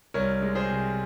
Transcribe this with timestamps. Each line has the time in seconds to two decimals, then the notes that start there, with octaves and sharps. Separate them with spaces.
0.14 C2 A#4 C#5
0.42 G#3
0.55 G#4 C5
0.69 C3